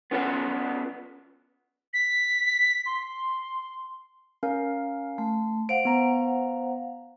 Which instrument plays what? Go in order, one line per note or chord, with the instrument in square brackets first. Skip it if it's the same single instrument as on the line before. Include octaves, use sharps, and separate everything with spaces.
[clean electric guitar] B3 C#4 F4 A4 B4 F#5
[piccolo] B6
C6
[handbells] C#4 A#4 F5
[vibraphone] A3
[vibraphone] C5 F5 F#5 [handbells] D7
[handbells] B3 A#5